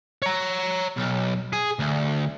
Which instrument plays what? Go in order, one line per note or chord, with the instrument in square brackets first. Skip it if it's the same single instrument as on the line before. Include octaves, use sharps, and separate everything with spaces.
[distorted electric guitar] C#5 A#5
B1
G#4
D2